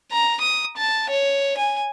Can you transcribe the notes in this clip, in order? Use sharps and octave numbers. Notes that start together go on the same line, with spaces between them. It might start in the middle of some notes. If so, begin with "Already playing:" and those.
A#5
D#6
A5
C#5
G#5